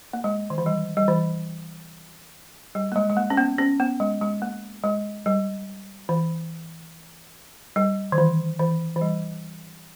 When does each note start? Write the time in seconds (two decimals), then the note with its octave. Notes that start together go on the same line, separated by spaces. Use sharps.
0.13 A#3
0.24 G#3
0.50 D#3
0.58 E3
0.66 G3
0.97 G3
1.08 E3
2.75 G3
2.92 A#3
2.96 G#3
3.10 G#3
3.17 A#3
3.30 C#4
3.37 B3
3.58 C#4
3.80 B3
4.00 G#3
4.21 G#3
4.42 A#3
4.84 G#3
5.26 G3
6.09 E3
7.76 G3
8.12 D#3
8.18 E3
8.59 E3
8.96 E3
9.01 G3